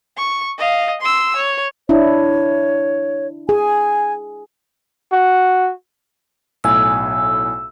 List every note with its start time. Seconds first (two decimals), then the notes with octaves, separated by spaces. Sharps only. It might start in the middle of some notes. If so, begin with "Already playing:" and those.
0.17 C#6
0.58 D#5 F5
1.01 C6 E6
1.36 C#5
1.89 D4 E4 C#5
3.49 G#4 G#5
5.12 F#4
6.64 B1 A2 G#5 E6